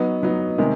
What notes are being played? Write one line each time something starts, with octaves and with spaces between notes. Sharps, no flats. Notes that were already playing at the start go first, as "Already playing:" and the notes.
Already playing: F#3 B3 D#4
F#3 B3 D#4
C3 D#3 G#3